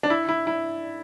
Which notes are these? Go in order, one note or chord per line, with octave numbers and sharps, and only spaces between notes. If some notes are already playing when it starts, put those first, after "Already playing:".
D4
E4
E4
E4